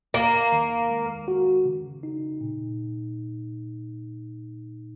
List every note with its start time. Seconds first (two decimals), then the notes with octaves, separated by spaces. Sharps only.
0.14 D#2 A#3
0.52 D#3
0.90 G#3
1.28 F#4
1.65 C#3
2.03 D#4
2.41 A#2